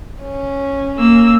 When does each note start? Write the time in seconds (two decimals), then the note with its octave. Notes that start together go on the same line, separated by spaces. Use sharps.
0.22 C#4
0.98 A#3 E6